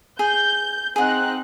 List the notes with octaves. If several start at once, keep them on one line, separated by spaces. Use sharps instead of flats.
G#4 G6
C4 D#4 G#4 F#5 F#6